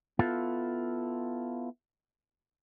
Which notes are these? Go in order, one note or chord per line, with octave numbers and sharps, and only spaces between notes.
B3 E4 F4 A4